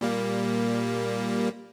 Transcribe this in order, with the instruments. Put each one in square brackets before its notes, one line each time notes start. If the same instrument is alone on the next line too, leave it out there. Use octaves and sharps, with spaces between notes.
[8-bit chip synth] A#2 G3 A#3